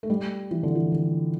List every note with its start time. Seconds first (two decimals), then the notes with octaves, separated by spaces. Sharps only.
0.03 A3
0.10 G3
0.51 E3
0.63 D3
0.75 E3
0.92 D3